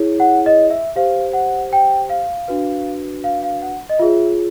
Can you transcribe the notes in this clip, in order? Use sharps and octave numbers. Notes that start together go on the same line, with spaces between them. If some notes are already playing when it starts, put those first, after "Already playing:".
Already playing: E4 G#4 C#5
F#5
D#5
E5
G4 C5 F5
F#5
G5
F5
D4 F#4 B4
F5
F5
F#5
D#5
F4 G#4 C#5 E5